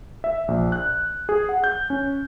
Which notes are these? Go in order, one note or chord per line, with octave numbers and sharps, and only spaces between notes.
E5
A#1
F#6
G#4
F#5
G6
C#4